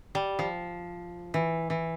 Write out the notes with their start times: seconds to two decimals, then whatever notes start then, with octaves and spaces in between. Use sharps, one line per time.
0.15 G3
0.39 F3
1.34 E3
1.70 E3